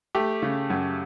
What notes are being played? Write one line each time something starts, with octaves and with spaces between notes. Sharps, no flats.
A3 G4
C#3
F#2